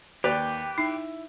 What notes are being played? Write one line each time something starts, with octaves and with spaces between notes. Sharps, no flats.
D#2 G4 B4 D5
D#4 E4